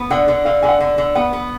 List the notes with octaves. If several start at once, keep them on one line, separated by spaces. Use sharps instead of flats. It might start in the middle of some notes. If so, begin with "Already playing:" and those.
Already playing: B3
D3 F#5
D3
D3 F5
D3 G#5
F#5
D3
D3
B3 F#5
B3